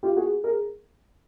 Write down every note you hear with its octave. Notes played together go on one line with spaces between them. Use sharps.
F4 G4
F#4 G#4
G#4 A#4